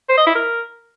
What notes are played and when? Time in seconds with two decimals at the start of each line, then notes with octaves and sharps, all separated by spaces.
0.09 C5
0.18 D#5
0.27 E4
0.35 A#4